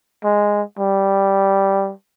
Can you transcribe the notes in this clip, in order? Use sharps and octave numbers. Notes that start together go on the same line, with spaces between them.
G#3
G3